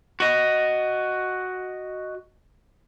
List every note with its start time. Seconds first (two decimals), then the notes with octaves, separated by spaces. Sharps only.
0.20 F#4 D#5